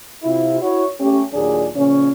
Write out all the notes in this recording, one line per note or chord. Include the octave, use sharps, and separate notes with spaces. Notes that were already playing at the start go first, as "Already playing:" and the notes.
C3 E4 F4
E4 F#4 C#5
A3 C#4 G4
D#2 A#2 F#3 D4 D#4 G#4
A#2 C#3 F3 C#4